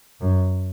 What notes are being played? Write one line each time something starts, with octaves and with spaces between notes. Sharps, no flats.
F#2